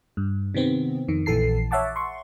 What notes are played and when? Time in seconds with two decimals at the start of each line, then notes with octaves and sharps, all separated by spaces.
0.17 G2
0.54 C3 D#3 B3 C4
1.08 F2 D#3
1.26 A#1 E3 A4 A5 C7
1.71 C#5 E5 F#5 A5 D6
1.96 C6 C#6